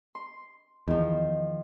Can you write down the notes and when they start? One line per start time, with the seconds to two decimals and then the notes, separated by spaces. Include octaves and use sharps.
0.15 C6
0.88 E2 D#3 F3